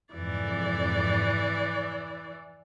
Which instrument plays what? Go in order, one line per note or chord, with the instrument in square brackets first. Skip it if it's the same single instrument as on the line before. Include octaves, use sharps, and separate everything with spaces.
[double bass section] F2 G#2 C3 [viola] E3 D5